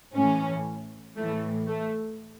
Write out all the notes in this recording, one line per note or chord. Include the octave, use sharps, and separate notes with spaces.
A2 E3 C#4
A2 E3 A3
A3